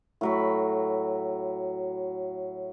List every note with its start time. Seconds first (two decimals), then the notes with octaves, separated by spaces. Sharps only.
0.21 A2 F#3 B5